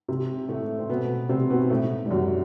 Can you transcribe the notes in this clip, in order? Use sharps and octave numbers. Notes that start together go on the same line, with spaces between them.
C3
A2 A3
C4
B2 B3
C3 C4
B2 B3
A2 A3
G3
F#2 F#3